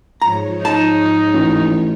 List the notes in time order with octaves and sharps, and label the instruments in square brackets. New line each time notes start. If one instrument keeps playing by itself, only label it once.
[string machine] G#2 F3 C#5 [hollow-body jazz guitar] A#5
[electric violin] D#4 [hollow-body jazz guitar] A5
[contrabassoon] A1